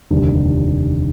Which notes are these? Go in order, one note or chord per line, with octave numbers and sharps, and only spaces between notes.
F1 D#2 D3 G3